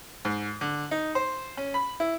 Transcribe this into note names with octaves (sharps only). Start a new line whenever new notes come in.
G#2
D3
D#4
C5
C#4
B5
E4